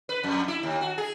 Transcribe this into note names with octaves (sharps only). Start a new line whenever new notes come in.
B4
F2
E4
D#2
F#4
G#4